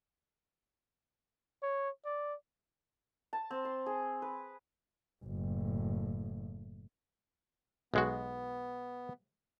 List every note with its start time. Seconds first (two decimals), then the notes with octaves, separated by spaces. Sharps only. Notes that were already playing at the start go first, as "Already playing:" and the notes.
1.63 C#5
2.05 D5
3.33 A5
3.51 C4
3.65 C6
3.86 G#4
4.22 B4
5.25 F#1 A2
7.94 B1 G#3 B3 F#4